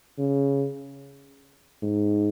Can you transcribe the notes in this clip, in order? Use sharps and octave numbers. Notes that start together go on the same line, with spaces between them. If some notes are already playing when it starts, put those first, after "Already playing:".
C#3
G#2